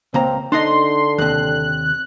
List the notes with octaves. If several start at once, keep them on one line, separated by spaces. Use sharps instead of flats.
C#2 A#3 C4 A#5
D3 D4 D#4 D#5 C6
D#2 C3 F#6